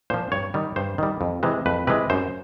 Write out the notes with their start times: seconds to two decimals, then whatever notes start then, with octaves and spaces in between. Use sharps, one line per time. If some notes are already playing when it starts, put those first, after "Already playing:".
0.10 A#2 F3 C5
0.32 G2 C#5
0.54 D#3 G3
0.76 G2 C5
0.98 D#3 G3
1.21 F2
1.43 C3 E3 G#3
1.66 F2 B4
1.87 C3 E3 G#3 B4
2.10 F#2 C5